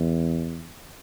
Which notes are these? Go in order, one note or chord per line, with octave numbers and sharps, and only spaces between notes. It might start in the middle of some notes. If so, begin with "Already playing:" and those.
Already playing: E2